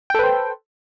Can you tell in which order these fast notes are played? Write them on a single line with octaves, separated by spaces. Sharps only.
G5 A4 B4 C5